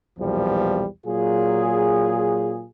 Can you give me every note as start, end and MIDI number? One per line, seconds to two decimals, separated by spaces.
0.19 0.85 35
0.19 0.85 40
0.19 0.85 46
0.19 0.85 53
0.19 0.85 55
1.06 2.65 46
1.06 2.65 54
1.06 2.65 65
1.06 2.65 68